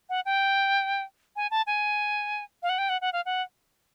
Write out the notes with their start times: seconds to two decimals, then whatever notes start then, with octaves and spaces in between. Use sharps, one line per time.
0.09 F#5
0.25 G5
1.36 G#5
1.51 A5
1.67 G#5
2.63 F5
2.69 F#5
2.78 G5
2.89 F#5
3.01 F#5
3.13 F5
3.25 F#5